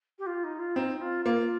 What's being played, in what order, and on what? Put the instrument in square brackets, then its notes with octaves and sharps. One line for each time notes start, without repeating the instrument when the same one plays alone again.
[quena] G4
F4
D#4
F4
[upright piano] C4 [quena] D#4
[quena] F4
[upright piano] A#3 [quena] F4